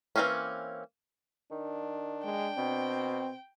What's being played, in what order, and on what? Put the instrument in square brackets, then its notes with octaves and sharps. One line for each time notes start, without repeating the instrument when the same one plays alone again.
[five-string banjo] E3 G#3 A#3 C4 C#4
[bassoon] D#3 [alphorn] D4
[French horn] G#3 [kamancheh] G5
[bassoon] B2 [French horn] C4